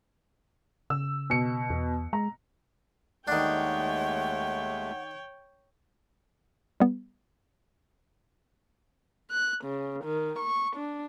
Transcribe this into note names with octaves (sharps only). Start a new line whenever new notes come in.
C#3 E6
B2 C#7
E2
G#3 A#5
D#2 D#3 G#3 A3 D4 C#5 F#5 G5
G3 B3
F#6
C#3
D#3
C#6
D4